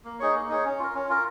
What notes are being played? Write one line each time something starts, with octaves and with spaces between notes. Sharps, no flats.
A#3
D#4 G#4 C#5
A#3
D#4 G#4 C#5
C#4
F4 A#4
C#4
F4 A#4